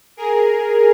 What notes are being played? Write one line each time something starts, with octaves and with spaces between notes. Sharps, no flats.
G#4 A#4